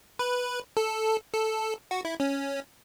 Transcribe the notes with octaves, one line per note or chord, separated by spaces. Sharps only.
B4
A4
A4
F#4
E4
C#4